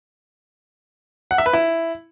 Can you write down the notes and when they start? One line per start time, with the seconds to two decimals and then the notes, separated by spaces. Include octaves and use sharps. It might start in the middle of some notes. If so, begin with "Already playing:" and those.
1.31 F#5
1.38 E5
1.46 B4
1.53 E4